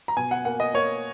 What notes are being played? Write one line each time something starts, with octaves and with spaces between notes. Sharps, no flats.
A#5
B2 G#5
F#5
A#3 F#5
D#5
A#3 C#5